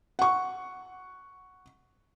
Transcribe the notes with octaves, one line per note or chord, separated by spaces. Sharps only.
F#5 C#6